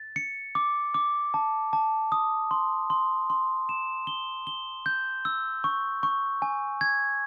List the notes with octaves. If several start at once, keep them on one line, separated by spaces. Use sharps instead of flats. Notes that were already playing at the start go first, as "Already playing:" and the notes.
Already playing: A6
C#7
D6
D6
A5
A5
D#6
C6
C6
C6
E7
G7
G7
G6
E6
C#6
C#6
G#5
G#6